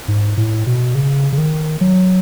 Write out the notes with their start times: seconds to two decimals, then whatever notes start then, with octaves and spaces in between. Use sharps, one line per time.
0.08 G#2
0.37 A2
0.66 B2
0.95 C#3
1.32 C#3
1.38 D#3
1.81 F#3